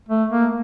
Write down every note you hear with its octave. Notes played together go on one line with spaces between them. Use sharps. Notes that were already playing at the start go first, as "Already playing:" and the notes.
A3
A#3